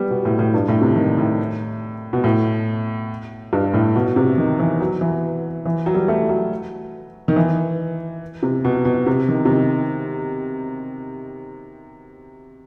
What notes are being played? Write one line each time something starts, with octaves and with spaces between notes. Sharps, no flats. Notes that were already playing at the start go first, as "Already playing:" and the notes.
Already playing: G3 B3
B2
A2
A2
G2
A2
C3
D#3
A2
B2
A2
G2
A2
B2
C3
D#3
E3
F#3
E3
E3
F#3
G3
A3
F#3
D#3
E3
C3
B2
B2
C3
D#3
C3
D#3